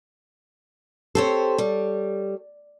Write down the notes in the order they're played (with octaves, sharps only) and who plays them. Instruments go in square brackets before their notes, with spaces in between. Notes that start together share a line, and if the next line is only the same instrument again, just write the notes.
[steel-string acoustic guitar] C4 G4 C5 [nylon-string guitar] A4 C#5
[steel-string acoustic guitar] G3